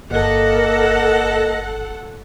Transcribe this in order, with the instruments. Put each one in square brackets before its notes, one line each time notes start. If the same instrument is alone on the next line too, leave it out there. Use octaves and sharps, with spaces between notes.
[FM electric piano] G1 [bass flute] A#3 [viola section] A4 F#5 [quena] D#5